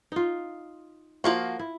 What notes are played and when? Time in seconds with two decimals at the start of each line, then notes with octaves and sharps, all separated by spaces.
0.12 D#4 F4
1.24 F3 A#3 F4 F#4
1.59 E4